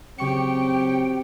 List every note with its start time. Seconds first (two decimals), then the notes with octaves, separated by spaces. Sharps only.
0.18 C#3 F#3 C4 G4 G5 C#6 C#7